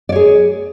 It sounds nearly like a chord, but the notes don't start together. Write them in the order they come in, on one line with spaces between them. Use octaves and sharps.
D5 C#5 G#4